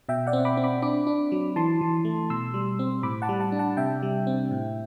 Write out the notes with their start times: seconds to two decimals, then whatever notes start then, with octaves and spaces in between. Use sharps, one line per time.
0.09 B2 E5 G5
0.27 D5 F#5
0.33 C4
0.45 B5 D6
0.57 C4
0.64 B5 D6
0.82 D4 B5 D6
1.07 D4
1.32 F#3
1.56 E3 A5 C6
1.81 E3
2.05 A3
2.30 B2 C6 E6
2.54 G3
2.79 C4
3.03 A2 B5 D6
3.22 F#5 A5
3.29 G3
3.40 F#5 A5
3.52 D4
3.59 F#5 A5
3.77 C3 E5 G5
4.03 G3
4.27 C4
4.51 A2